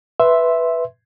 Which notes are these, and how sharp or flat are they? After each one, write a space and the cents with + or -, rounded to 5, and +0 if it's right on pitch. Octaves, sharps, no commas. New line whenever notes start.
B4 +0 E5 +0 C6 +0